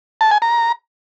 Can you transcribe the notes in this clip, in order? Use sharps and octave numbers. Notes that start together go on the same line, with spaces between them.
A5
G#5
A#5